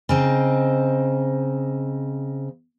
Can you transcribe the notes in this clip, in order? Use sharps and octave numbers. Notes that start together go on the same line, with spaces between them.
C#3 C4 D#4